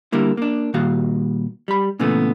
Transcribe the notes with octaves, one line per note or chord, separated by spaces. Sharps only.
D3 G3 A#3 E4
A#3 D4
A#2 D#3 G3 F#4 F5
G3 B5
A#2 C#3 E3 A3 B3